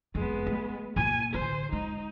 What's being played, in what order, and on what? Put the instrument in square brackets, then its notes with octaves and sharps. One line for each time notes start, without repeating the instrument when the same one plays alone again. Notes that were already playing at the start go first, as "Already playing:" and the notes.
[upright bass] F#1 F2 [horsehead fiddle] G#3 B3
[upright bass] A3
[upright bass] A#2 A#3 [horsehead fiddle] G#5
[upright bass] A1 D3 [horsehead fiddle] C5
[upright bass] G#3 [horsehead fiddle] D#4